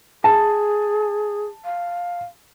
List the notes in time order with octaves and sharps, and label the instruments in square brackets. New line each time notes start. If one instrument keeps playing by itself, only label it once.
[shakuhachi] G#4 [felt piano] A5
[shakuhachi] F5